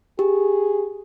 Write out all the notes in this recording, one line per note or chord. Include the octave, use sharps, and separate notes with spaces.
G4 G#4